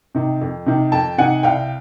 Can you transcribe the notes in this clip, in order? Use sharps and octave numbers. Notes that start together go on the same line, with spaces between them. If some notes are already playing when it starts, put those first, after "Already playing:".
C3 D#3
F2
C3 D#3
F2 G5 A5
C3 D#3 F#5 G#5
C2 F5 G5